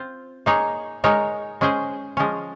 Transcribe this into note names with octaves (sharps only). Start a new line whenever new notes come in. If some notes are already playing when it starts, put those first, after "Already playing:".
Already playing: C4 F4 C5
A#3 D#4 G#4 C#5
G#3 D#4 A#4 C#5
G#3 C#4 G#4 C5
F3 G#3 C#4